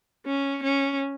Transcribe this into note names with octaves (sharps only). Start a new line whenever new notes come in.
C#4
C#4